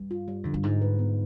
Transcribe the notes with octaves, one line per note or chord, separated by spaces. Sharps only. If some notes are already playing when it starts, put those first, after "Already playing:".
Already playing: G2
F4
G3
F2 D3
G2
G#2 D#4
B4
B3